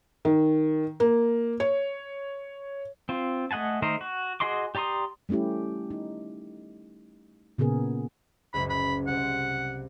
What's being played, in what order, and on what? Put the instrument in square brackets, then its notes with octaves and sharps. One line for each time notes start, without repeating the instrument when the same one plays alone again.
[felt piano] D#3
A#3
C#5
[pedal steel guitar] C4 F4
A3 D#5 F#5 G#5 A5
D#3 A3 A#4 C5 D#5
F#4
F#4 G#4 D#5 C6 D6
G4 D5 A#5 C6 D#6
[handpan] G3 A3 C#4 E4 G4
D#4
A#2 C#3 B3 G#4 A#4
[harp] F#1 C#2 [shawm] B5
[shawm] B5
[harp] C2 [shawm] F#5